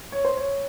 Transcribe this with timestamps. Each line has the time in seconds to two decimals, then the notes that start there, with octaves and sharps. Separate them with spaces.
0.12 C#5
0.25 C5
0.37 C#5